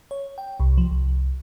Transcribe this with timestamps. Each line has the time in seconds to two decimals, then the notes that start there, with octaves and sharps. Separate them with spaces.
0.11 C#5
0.38 G5
0.60 C2
0.78 F3
0.91 C2